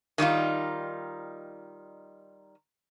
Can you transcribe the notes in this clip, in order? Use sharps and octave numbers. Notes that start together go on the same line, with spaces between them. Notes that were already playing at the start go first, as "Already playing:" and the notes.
D#3 G3 D#4 F4